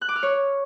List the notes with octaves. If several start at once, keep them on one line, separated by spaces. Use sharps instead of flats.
F#6
D6
F6
C#5